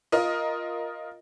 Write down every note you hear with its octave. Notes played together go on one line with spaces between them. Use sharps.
F4 A#4 D#5